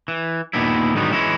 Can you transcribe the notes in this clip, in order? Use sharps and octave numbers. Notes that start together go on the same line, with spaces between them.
E3
D#2 A#2 D#3 B3 D4 E4
G#2 D3 D#3 F#3 G3 B3
E3 G#3 C#4 E4